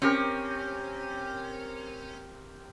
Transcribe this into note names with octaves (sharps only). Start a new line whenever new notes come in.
C4 C#4 G4 A#4